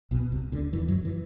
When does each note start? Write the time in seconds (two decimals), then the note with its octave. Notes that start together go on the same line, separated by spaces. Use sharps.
0.11 B1 B2
0.32 C2 C3
0.52 D2 D3
0.73 E2 E3
0.88 F#2 F#3
1.05 E3